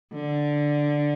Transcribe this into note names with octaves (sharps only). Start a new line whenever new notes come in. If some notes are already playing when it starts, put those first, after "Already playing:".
D3